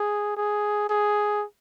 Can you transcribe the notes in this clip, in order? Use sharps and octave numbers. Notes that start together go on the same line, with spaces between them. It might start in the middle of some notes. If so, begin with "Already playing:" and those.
Already playing: G#4
G#4
G#4